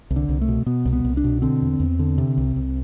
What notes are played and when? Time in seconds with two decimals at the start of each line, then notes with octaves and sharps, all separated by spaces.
0.10 C2
0.16 D3
0.29 C2
0.41 A3
0.48 B2
0.66 B2 B3
0.85 C2
0.92 B3
1.04 C2
1.17 D4
1.24 B2
1.42 D3 C4
1.62 E2
1.80 E2
1.99 D3
2.18 C3
2.38 C2
2.56 C2